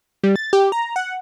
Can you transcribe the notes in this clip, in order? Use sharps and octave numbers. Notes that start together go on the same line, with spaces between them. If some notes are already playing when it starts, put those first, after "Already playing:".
G3
A6
G4
A#5
F#5